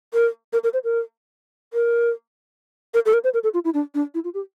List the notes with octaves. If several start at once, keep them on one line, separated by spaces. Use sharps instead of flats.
A#4
A#4
A#4
C5
A#4
A#4
A#4
A4
A#4
C5
A#4
A4
F4
E4
D4
D4
E4
F4
G4